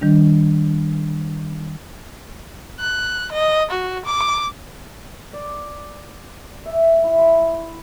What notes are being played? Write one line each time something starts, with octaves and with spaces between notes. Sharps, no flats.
D#3 G3 D4
F#6
D#5
F#4
D6
D5
E5
E4
C6